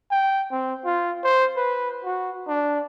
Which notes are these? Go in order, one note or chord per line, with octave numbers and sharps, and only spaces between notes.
G5
C4
F4
C5
B4
F#4
D4